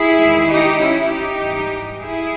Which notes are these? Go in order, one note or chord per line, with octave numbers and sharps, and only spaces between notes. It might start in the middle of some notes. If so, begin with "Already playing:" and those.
Already playing: E4 G#4
E2 D#3 G#3
D#4 G4
C#4 E4
D#4 G4
G#2 E3 G3
E4 G#4